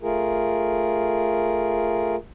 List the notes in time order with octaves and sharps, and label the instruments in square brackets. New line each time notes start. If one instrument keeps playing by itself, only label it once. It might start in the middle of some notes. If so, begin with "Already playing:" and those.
[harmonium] A3 F4 G#4 A#4